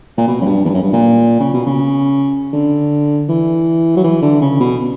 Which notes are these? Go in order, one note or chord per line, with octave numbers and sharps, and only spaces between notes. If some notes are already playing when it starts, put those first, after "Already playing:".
A#2
B2
F#2
G2
E2
G2
F#2
G2
A#2
C#3
B2
C#3
D3
E3
F#3
E3
D3
C#3
B2